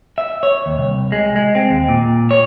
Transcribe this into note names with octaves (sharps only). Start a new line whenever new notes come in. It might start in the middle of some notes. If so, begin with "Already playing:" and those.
E5
C#5
D#2
C2
G#3
G#3
C4
D#2
A#2
C#5